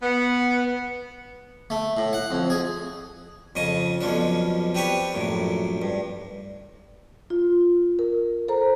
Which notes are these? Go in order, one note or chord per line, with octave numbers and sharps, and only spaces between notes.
B3
A3
A2
F#5
F2
G#4
F2 C#3 D#5 A5
B1 F2 F3 C#4 D4
C4 D4 G4 B4 C#5 A5
A#1 F#2 A2
G2
F4
A#4
A4 C5 A#5